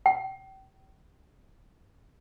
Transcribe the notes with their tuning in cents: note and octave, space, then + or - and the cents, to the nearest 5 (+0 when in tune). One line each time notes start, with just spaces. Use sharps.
G5 -35